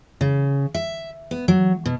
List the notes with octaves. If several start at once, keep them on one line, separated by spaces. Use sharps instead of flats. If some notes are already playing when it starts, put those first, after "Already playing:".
C#3
E5
B3
F#3
B2